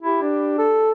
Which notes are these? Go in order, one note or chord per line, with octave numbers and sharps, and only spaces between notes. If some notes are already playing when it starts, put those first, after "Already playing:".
E4 G4
D4
A4